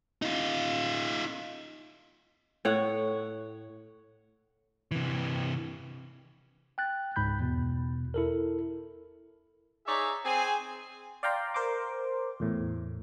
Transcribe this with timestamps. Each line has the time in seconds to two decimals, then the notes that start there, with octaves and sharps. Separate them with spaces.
0.22 D#4 F4
2.65 A2 C#5 F#5
4.91 C3 E3
6.78 G5 F#6 A6
7.16 C#2 G#2 B5 G6
7.40 E2 B2
8.14 E4 A4 A#4
9.87 D#4 G#4 C#5 D5 E5
10.25 C4 G#4 G#5
11.23 D5 F5 G5 A#5 C6
11.54 A#4 C5 C6 D6
12.40 E2 A2